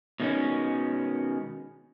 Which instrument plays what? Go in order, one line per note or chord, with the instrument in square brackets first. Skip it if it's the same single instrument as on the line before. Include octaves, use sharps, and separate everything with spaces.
[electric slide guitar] B2 D#3 G#3 A3 C#4